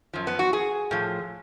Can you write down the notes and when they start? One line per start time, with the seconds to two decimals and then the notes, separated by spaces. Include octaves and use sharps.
0.13 F#2 F3
0.27 B3
0.39 F#4
0.53 G#4
0.91 A2 F3